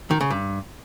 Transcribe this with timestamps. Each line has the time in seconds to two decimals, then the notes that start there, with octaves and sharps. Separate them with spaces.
0.11 D#3
0.21 C#3
0.31 G2